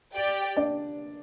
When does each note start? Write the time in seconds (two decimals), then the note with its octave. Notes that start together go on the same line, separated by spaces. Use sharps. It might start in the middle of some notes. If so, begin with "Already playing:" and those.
0.14 G4 D5 G5
0.57 D4 D5